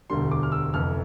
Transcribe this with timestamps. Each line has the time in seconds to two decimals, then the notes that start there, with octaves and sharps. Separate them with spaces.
0.10 E1 D2 D3 G3 C6
0.31 D6
0.43 F6
0.52 E6
0.74 F1 F2 E3 F6